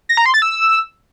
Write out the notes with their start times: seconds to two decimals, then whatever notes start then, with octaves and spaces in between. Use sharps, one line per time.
0.09 A#6
0.17 A#5
0.26 C6
0.34 A6
0.42 E6